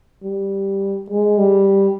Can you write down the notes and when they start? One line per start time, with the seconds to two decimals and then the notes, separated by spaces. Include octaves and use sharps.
0.23 G3
1.10 G#3
1.38 G3